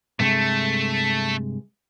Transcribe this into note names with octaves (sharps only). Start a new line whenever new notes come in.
G2 C3 G#3 A3